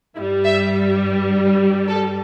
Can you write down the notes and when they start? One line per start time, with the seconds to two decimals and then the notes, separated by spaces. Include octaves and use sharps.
0.16 G2 E4
0.20 G3
0.44 E5
1.88 A4